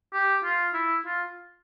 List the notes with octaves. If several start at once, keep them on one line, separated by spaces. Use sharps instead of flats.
G4
F4
E4
F4